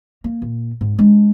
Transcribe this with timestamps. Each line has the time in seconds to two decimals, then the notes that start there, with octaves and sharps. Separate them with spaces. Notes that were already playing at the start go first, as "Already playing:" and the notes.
0.24 A#3
0.42 A#2
0.81 G#2
0.99 G#3 D4